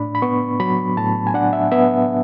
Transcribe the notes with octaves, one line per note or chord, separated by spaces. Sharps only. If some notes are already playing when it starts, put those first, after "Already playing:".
Already playing: A2 D4 B5
B5
B3 C#6
F#3 B5
A2 A5
G#5
D4 F#5
E5
B3 E5